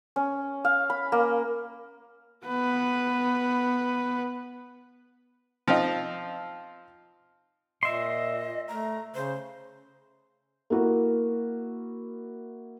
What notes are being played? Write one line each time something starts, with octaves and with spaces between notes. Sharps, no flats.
C#4
F5
B5
A#3
B3 B4
F3 C4 D#4 F4
A#2 D#5 E5 C6
A3 A#5
C#3 C5
A#3 E4 F#4 A#4